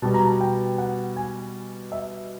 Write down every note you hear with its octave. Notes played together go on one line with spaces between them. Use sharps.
B2 G3 B3 A5
A#5
A5
G5
F#5
G#5
E5